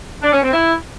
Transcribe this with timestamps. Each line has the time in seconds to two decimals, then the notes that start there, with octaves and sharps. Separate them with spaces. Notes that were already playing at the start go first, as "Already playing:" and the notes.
0.22 D4
0.32 C#4
0.43 C4
0.53 E4